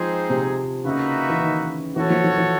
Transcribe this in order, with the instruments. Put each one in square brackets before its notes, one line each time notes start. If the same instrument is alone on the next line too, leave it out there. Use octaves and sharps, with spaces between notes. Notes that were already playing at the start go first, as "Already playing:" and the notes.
Already playing: [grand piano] F3 [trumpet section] G#3 C4 D#4 G#4 C5
[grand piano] C3
[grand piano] C#3 [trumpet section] A#3 D#4 F#4 B4 E5
[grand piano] E3
D#3
[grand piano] E3 [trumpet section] F#4 A4 C#5
[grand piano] F3
F3
E3